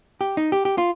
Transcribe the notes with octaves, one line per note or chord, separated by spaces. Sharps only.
G4
D#4
G4
G4
F4